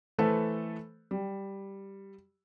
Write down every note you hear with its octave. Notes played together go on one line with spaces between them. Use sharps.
E3 A3 A4 B4 C5
G3